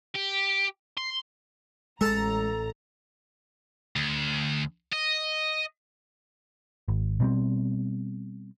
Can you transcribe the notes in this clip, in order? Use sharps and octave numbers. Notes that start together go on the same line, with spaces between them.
G4
C6
A1 G#3 A4 A5 A#5
D2
D#5
G#1
B2 G3 C4